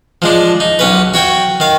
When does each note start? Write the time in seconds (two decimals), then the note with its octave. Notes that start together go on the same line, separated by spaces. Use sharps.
0.22 F3 G#3 D4
0.60 D#4
0.79 B1 C#4 B4
1.14 F#4 C#5 G5
1.60 D#3 F5